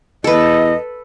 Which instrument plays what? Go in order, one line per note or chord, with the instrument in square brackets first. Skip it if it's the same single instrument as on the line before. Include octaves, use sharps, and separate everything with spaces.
[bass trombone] E2 [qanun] A4 B4 [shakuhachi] D#5